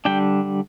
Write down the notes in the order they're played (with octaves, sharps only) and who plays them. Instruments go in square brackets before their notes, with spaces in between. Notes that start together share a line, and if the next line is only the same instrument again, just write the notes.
[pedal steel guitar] D3 G3 D4 G5